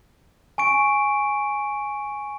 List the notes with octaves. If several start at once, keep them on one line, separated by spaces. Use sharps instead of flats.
G#5 C#6 D7